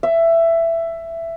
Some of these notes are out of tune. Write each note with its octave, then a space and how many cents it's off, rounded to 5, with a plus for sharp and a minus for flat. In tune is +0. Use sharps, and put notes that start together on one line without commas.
E5 +15